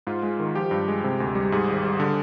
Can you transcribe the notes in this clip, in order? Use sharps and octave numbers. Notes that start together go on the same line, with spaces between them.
G#2 F4
G#3
D#3
F3 G4
G2
G#3
C3
D2
G3
G#2 G#4
G#1
G3
D3